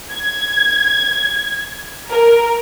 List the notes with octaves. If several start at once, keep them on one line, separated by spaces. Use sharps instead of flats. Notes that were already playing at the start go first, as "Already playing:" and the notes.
G#6
A#4